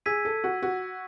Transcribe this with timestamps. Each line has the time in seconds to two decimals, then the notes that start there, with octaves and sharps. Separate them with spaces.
0.06 G#4 E6 G#6 B6 D#7
0.25 A4
0.44 F#4
0.62 F#4